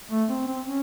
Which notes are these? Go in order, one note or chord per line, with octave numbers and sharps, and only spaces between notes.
A3
C4
C4
C#4